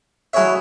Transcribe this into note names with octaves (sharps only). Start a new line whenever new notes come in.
F#3 E4 G#4 C#5 E5